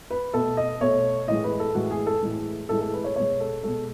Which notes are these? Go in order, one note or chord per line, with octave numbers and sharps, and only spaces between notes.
B4
B2 A3 A4
D#5
B2 A3 C#5
A2 E3 G#3 D#5
B4
A4
A2 E3 G#3 F#4
G#4
A4
A2 E3 G#3
A2 E3 G#3 A4
A4
B4
C#5
B2 G#3 C#5
A4
B2 G#3 A4